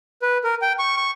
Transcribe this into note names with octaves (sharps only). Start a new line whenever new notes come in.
B4
A#4
G5
C#6
C#6